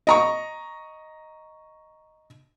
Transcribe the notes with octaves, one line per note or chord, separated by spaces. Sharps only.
D#5 A#5 C#6